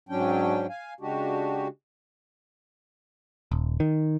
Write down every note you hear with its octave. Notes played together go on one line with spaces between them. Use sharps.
G#2 F#3 C#4 D4 G5
F5 G#5
C#3 G#3 D4 F#4 G4
D#1
D#3